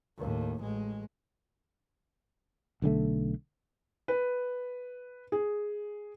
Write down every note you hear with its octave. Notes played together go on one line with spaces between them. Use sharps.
D#2 A2
A1 G#3
B1 D3 G3 A3
B4
G#4